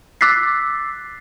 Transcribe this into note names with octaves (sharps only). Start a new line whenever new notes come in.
D6 E6 F#6 A6 B6 C7